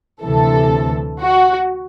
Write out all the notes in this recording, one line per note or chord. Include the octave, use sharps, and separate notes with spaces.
D2 C3 E3 A4
F#4